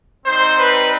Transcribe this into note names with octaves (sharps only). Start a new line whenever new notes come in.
G3 C4 D#4 C5
B4